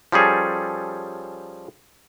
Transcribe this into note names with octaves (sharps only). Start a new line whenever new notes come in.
F3 G3 C#4 G#4 A4